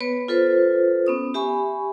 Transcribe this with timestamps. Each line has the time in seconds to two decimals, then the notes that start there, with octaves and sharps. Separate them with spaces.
0.01 B3 B4 C#5
0.28 F4 A4 B4 C5
1.07 B3 C#4 D#6
1.34 G4 E5 G#5 B5 C#6